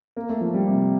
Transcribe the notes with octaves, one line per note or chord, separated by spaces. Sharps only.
A#3
A3
F3
G3
C3